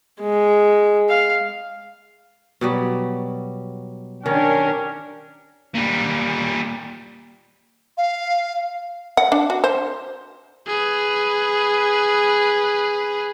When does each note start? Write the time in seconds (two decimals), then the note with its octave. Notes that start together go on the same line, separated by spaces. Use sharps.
0.20 G#3
1.09 F5
2.61 B2 F#3 G3
4.26 D#3 C#4 D4 G4 A#4
5.74 A#2 G3
7.97 F5
9.17 F#5
9.32 D4
9.50 F#4
9.64 C5
10.66 G#4 B4